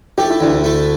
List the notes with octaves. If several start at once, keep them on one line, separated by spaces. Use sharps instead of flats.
A3 G4
E4
D2 D4
E4
A3